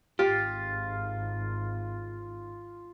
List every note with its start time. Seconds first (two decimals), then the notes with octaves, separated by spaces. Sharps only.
0.19 G#1 F4 G4